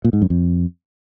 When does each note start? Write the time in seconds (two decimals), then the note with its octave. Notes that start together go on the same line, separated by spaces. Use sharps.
0.04 A#2
0.13 G#2
0.22 F#2
0.30 F2